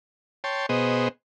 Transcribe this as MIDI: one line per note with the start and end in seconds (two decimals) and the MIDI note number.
0.44 0.66 73
0.44 0.66 79
0.44 0.66 81
0.44 0.66 84
0.69 1.08 47
0.69 1.08 59
0.69 1.08 68
0.69 1.08 72
0.69 1.08 75